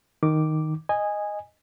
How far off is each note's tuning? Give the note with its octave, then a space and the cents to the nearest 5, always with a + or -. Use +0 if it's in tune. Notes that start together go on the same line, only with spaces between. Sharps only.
D#3 +0 D6 +0
D#5 -5 G#5 -10